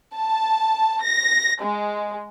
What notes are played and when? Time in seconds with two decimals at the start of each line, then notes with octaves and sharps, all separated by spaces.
0.17 A5
1.03 A#6
1.62 G#3